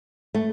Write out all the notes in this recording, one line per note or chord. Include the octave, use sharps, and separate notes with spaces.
A3